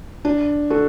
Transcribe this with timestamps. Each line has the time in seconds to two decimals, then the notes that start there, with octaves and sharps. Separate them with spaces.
0.25 D4
0.70 F#4 A4